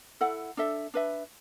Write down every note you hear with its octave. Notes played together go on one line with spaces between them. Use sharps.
E4 A4 F#5
D4 A4 E5
D4 B4 E5